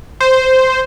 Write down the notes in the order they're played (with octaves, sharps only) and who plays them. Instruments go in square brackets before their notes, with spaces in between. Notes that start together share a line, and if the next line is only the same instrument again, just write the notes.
[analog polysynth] C5